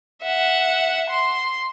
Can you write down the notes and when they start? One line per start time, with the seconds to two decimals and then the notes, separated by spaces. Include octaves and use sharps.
0.23 E5 F#5
1.10 C6